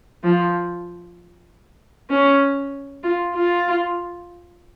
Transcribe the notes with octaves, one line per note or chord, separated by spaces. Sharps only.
F3
C#4
F4
F4